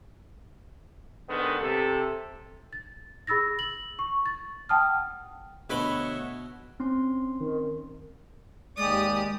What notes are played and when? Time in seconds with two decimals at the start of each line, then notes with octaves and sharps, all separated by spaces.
1.29 G#2 D3 D#3 B3
1.60 C3 A4
2.73 A6
3.27 G#4 B5 E6 A6 A#6
3.59 F#7
3.99 C#6
4.26 A6
4.69 F#5 G5 A5 D#6 F6
5.70 D2 B2 B4 C#5 E5 F#5 G5 B5
6.80 C4 C#4 C6
7.40 D#3
8.78 D#2 G#3 G4 D5 D#6